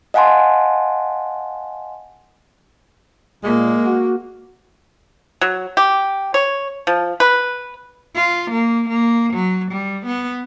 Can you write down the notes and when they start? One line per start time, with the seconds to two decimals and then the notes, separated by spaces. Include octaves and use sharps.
0.14 D#5 F5 F#5 G#5 A5 C6
3.44 A#2 G#3 A#3
3.85 F#4
5.41 F#3
5.77 G4
6.34 C#5
6.87 F3
7.20 B4
8.15 F4
8.50 A#3
8.89 A#3
9.33 F#3
9.71 G3
10.06 B3